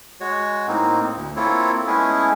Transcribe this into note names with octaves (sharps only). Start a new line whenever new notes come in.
G#3 F#4 C#5
A2 A#3 C4 D#4
D2
A#3 C4 E4 F4 A4 C#5
G#3 A3 B3 C#4 E4 G#4